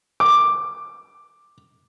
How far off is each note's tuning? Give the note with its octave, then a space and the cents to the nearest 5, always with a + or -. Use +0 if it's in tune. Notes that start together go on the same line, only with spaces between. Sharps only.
D6 +5